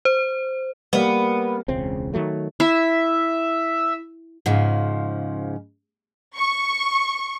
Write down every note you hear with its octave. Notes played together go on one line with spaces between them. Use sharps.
C5
G3 A#3 B3
E1 C#2 C#3 C4
D#3 F3 F#3 A3
E4 E5
G#2 C#3 F3
C#6